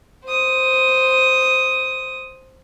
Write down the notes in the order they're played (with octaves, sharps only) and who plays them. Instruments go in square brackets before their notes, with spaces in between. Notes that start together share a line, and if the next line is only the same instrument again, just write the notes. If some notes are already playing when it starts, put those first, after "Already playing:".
[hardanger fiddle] C5 D#6